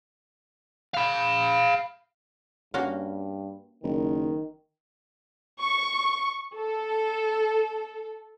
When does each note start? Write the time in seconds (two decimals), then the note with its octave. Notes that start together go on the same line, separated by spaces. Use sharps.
0.94 F5 B5
2.74 G2 A#3 C#4 F#4
3.84 F#1 D#3
5.62 C#6
6.55 A4